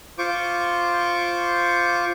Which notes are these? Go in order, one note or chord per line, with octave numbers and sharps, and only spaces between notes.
F4 C5 C#6 D6